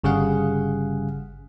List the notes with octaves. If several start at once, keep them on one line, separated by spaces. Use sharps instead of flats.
G1 C#3 G3 G#4 F5 F#5